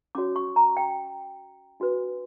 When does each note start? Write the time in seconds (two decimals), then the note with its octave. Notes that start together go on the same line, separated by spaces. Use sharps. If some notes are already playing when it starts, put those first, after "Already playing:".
0.15 C#4 F#4 C#5 D6
0.36 C#6
0.56 A#5
0.77 G5
1.80 D4 F#4 B4